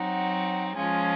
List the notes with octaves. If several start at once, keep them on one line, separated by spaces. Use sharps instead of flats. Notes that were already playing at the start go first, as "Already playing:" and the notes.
Already playing: F#3 C4 D#4 F#5
F3 G#3 C#4 F4 G#5